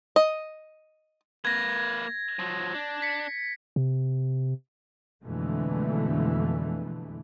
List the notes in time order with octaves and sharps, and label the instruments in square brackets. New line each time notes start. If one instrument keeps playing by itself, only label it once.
[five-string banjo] D#5
[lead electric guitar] A#3 B4 [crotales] G#6 A#6
[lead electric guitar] F3 F#3
D4
[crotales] B6 C#7
[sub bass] C3
[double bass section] F2 B2 D3 E3 G#3 A3